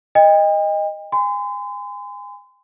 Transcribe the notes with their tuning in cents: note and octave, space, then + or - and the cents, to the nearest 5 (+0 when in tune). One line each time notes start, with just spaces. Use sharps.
D#5 +0 G5 +40
G#5 -30 C6 -40